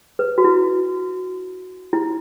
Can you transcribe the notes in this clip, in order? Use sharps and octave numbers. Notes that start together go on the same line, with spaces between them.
B4
F#4
E4
E4